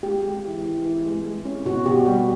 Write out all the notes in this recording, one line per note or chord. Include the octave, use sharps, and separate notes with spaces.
G#3 G4
G#3
E3
E3
E3
G#3
G#3
C#4
B2 F#4
B2 G4
G3 G4